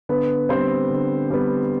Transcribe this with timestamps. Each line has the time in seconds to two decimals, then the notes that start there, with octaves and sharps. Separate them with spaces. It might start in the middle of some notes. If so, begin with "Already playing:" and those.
0.09 D3 B3 B4
0.49 G3 B3 C4 C5
0.90 D3
1.30 G3 B3